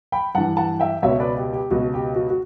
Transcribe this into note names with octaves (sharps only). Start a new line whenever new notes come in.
G5 B5
G2 E3 F#5 A5
F#5 A5
E5 G5
C#2 B2 C#5 E5
B4 D5
G4
G4
C#2 B2 F#4
G4
F#4
F#4